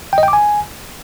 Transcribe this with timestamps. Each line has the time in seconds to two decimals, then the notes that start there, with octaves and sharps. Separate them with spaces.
0.13 G5
0.18 D#5
0.23 G5
0.28 D6
0.33 G#5